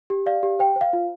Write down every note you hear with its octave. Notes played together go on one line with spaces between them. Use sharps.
G4
D5 F5
G4
C5 G5
C5
F5
F4